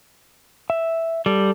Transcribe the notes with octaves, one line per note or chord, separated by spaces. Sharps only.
E5
G3 A4